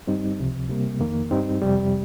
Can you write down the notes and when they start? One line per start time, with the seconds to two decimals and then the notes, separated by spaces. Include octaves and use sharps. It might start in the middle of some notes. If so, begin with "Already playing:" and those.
0.07 G2 G3 C4 D#4
0.39 C#2 C3 F3
0.69 C3 G3 A#3
1.00 F2 D#3 A#3
1.31 G2 G3 C4 D#4
1.62 F2 C3 G3